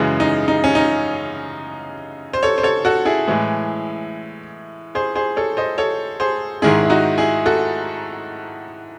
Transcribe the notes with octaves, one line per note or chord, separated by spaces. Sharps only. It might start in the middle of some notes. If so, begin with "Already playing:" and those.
Already playing: F#2 C#3 E3 G#3
D#4
D#4
C#4
D#4
C5
A4 C#5
C5
A4 C#5
F#4 A4
E4 G#4
A2 E3 G#3
G#4 C5
G#4 C5
A4 C#5
C5 D#5
A4 C#5
G#4 C5
G#2 D#3 G#3 E4 G#4
E4
D#4 F#4
E4 G#4
F#4 A4